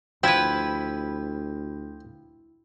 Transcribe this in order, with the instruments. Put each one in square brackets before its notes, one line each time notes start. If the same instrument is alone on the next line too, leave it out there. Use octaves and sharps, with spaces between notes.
[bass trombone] D2 [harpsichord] F3 [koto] E4 B4 [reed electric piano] G5 G#6